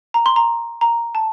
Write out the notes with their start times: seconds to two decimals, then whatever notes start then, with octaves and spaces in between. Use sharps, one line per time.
0.14 A#5
0.26 C6
0.36 A#5
0.81 A#5
1.15 A5